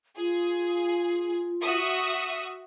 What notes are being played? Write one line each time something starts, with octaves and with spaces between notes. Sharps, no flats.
F4 G#4
F#4 E5 D#6